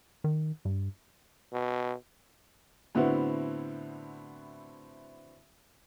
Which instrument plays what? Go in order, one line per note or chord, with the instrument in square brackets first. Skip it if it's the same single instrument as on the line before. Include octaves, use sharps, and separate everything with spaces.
[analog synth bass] D#3
G2
[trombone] B2
[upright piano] A2 D3 B3 C4 E4 F#4